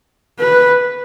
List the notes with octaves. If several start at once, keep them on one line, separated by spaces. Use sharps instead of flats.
B4